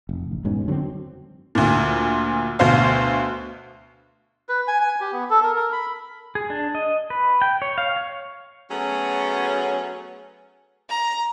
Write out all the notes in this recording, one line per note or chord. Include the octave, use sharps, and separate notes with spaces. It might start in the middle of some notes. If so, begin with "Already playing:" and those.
F1
A1
E1 G#2 B2 C#4
D3 F#3 B3 C4
D2 A#2
D2 B2 C5 F5
B4
G#5
G#5
G4
B3
A4
A#4
A#4
B5
G#4
D4
D#5
B4
G5
C#5
F5
C#5
F#3 A3 B3 C#4 G#4 C#5
A#5